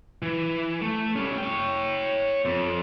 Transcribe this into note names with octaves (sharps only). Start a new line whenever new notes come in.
E3
A3
G3 C#4
C#5 G5
F2